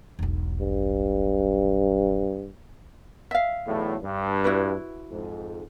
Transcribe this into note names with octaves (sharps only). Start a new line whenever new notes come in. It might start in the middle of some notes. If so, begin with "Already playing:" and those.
E1 B1
G2
E5 F5
B1 E2 A2
G2
E4 F#4 B4
F2 G#2